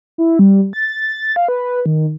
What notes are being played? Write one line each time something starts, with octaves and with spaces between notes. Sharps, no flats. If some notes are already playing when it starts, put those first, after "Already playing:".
E4
G3
A6
F5
B4
D#3